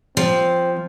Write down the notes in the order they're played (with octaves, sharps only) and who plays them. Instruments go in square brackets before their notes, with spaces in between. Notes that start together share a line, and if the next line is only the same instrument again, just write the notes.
[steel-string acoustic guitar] F3 [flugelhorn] C4